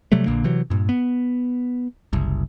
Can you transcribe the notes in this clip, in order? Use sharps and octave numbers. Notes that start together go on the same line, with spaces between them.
C3 F#3 G3 A3
A#1 A#2 D3 A#3
C3 E3 F#3
G2 A#2
B3
F#1 C2